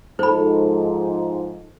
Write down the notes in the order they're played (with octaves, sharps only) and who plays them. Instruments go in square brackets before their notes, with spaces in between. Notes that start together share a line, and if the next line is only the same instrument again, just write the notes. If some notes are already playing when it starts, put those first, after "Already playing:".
[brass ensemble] G#2 F3 [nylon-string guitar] A4 [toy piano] C5 B5